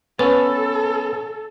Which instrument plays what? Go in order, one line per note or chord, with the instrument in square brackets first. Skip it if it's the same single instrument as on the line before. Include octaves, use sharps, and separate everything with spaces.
[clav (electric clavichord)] B3 C#4 [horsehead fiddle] A4 [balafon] B4